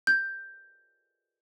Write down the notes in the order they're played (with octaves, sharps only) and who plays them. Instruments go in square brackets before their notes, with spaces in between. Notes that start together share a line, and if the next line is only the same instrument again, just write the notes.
[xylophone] G6